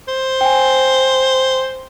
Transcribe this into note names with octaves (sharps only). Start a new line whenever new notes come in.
C5
G5 G#5